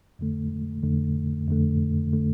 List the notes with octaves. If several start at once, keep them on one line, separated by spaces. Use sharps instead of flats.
F2 D3 A3
F2 D3 A3
F2 D3 A3
D3 A3